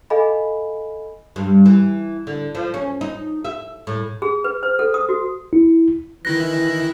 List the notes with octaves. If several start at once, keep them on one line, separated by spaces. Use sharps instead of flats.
A4 D#5 F5 G#5 B5
G2
E3
D3
F3
C#4
D#4
E5
A2
G#4
B4
C5
A4
D#6
F#4
E4
D#3 E3 E4 F#6 A#6